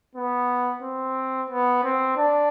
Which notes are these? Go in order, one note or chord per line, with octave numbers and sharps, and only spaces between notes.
B3
C4
B3
C4
D4